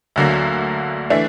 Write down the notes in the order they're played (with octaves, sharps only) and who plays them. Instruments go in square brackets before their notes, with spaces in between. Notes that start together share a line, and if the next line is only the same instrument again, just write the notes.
[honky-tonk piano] D2 D3 F#3 A#3
E3 A3 D4